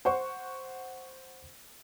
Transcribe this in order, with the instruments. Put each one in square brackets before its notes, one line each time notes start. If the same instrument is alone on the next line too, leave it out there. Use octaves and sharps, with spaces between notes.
[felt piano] C5 F#5 C#6